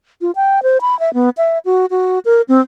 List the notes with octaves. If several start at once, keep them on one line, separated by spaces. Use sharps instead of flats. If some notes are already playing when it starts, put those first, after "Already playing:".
F4
G5
C5
B5
E5
B3
E5
F#4
F#4
A#4
C4